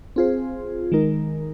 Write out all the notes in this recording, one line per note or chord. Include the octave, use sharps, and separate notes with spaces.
C4 F4 G#4 C5
D#3 G#3 D#4 A#4